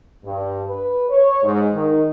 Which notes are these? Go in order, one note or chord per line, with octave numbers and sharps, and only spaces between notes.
G2
B4
C#5
G#2
D#3